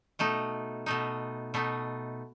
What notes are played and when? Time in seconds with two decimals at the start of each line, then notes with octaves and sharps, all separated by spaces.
0.19 B2 A3 D#4
0.86 B2 A3 D#4
1.54 B2 A3 D#4